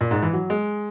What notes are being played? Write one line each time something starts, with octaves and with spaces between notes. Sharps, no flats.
A#2
G#2
E3
F#3
G#3